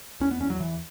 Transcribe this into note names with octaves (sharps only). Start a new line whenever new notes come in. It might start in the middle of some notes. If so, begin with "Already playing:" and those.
E2 C#4
B3
E2 C#4
F#3
E2 E3